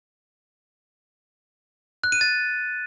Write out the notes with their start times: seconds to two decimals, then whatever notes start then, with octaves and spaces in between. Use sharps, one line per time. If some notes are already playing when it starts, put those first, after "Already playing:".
2.04 F#6
2.12 D#7
2.21 A6